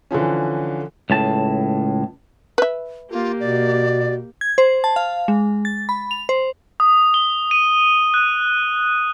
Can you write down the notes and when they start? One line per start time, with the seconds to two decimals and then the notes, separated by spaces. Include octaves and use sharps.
0.11 D3 E3 F3 C#4
1.10 C#2 A2 A5
2.58 B4 E5
3.11 A#3 F4 G4
3.40 B2 D5
4.41 G#6
4.58 C5
4.84 A5
4.96 F5
5.28 G#3
5.65 A6
5.89 B5
6.11 F7
6.29 C5
6.80 D#6
7.14 G7
7.51 D#7
8.14 F#6